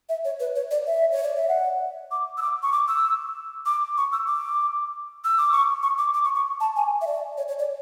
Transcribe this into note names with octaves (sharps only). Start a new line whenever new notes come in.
E5
C#5
B4
C#5
D5
E5
C#5
D5
E5
F#5
D6
E6
D6
C#6
D6
E6
D6
C#6
E6
D6
E6
D6
C#6
C#6
D6
D6
C#6
C#6
A5
G#5
E5
D5
C#5
C#5
D5